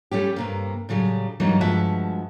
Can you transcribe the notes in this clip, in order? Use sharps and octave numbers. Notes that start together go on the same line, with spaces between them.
G3 A3 C#4 G4
G2 C3 A#3
A2 C#3 F#3 G3
G2 E3 F#3 G3 A#3 D#4
G2 F3 G#3 F#4 E5 A5